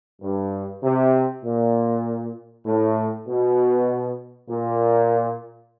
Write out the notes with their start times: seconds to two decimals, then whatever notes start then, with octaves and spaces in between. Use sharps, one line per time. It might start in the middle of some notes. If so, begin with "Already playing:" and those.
0.22 G2
0.84 C3
1.45 A#2
2.66 A2
3.27 B2
4.49 A#2